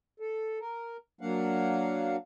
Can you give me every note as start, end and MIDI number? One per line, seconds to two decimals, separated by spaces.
0.20 0.59 69
0.60 0.97 70
1.21 2.16 54
1.21 2.16 58
1.21 2.16 62
1.21 2.16 77
1.21 2.16 78